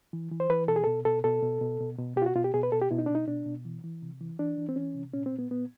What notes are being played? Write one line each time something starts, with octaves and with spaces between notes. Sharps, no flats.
E3
E3
C5
E3 B4
B2 A4
G#4
B2 A4
B2 A4
B2 A4
B2
B2
B2
B2
B2 G4
F4
F#4
B2 F4
G4
B2 G#4
B4
B2 A4
G4
B2 E4
D#4
D4
B2
D#4
B2 D4
B2
E3
E3
C3
E3
E3 D4
E3
C4
E3 C#4
C3
A#2 C#4
C4
A#2
B3
A#2 B3